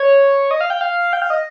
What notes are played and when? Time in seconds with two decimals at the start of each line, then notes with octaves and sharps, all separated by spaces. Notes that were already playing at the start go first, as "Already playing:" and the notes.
Already playing: C#5
0.51 D#5
0.61 F5
0.70 G5
0.81 F5
1.13 G5
1.22 F5
1.30 D#5